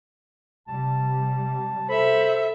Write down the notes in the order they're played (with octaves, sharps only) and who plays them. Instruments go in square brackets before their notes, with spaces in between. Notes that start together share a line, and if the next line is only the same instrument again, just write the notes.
[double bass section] C3 G3 [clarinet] A5
[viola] A4 E5 [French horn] C5 [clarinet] B5